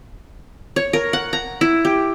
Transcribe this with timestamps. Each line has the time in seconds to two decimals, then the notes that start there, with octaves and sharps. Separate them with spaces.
0.76 C#5
0.93 A#4
1.13 F#5
1.33 A#5
1.61 E4
1.85 G4